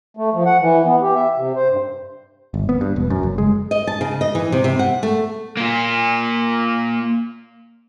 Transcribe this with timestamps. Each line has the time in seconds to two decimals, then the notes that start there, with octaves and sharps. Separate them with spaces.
0.17 A3
0.33 F3
0.46 F#5
0.61 E3
0.86 B3
1.02 G4
1.15 E5
1.37 C3
1.55 C5
1.69 G2
2.54 G1
2.69 B3
2.81 G2
2.96 E1
3.10 F#2
3.23 F#1
3.38 G#3
3.71 D#5
3.87 A5
4.01 C#3
4.21 D#5
4.35 E3
4.52 C3
4.64 C3
4.79 F#5
5.03 A3
5.57 A#3 F4